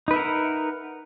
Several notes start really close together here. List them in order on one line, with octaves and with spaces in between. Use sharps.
D#4 B4 E5 A#4 F#5